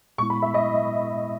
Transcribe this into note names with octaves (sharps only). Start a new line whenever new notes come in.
A#2 G#3 B3 E4 C#6
B5
E5
D#5